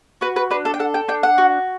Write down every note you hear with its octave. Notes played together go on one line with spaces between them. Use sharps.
F#4 B4
B4
D4 B4
A4
G5
A4 F#5
G5
D4 G5
F#5
F#4